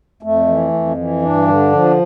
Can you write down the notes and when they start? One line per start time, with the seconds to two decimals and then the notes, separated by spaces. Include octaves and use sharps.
0.22 F2 A3
0.48 E3
0.73 F2
0.97 E3
1.22 G2 D4
1.47 D3
1.72 F3